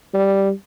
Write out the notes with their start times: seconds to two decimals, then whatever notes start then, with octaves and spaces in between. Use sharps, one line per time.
0.14 G3